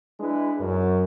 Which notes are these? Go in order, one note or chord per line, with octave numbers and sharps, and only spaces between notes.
G#3 D4 E4 B4
F#2